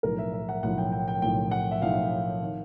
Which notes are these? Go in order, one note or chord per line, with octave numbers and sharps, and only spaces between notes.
B1 A2 F3 A#4
E5
E5
F#5
B1 A2 F3 F#5
G5
G5
G5
B1 A2 F3 G5
F#5
E5
B1 A2 F3 F5
D#3